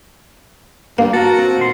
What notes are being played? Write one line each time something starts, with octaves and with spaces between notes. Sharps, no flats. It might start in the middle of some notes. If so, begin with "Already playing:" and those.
G2 A#3
F#4 A#4 A5
C4
A#2 D#3 C6